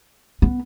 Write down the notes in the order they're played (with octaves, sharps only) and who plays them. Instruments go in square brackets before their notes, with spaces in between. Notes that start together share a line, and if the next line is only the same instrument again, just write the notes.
[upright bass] B3